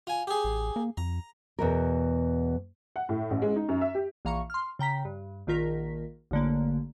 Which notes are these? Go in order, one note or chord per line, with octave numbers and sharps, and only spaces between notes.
F4 G#5
G4 G#4
A1
A#3
F2 A#5
E2 B2 A#4
F#5
A2
A1
G#3
D#4
F#2
E5
G4
A#1 E3 F5 A#5 C#6 C#7
C6 F6
C#3 G5 A#5 B6
G2
A#1 D#3 F4 A#4 B6
A1 D3 A#3